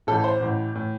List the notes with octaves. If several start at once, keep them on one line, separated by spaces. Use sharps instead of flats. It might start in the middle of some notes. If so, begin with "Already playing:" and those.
A1 A2 E3 A4
C5
A1 A2 E3
A2 E3